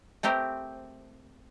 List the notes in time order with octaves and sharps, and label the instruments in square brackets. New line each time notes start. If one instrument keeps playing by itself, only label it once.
[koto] A3 C4 G4 A#4 C5